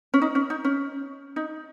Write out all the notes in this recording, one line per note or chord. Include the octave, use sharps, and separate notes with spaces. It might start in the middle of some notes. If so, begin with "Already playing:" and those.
C#4
D#4
C#4
D#4
C#4
D#4